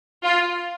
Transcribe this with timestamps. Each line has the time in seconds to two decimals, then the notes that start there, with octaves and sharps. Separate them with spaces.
0.24 F4